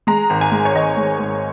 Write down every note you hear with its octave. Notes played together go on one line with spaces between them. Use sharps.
G#3 A#5
G#1
G#5
G#3
C#5
G#1 D#5
G#3
G#2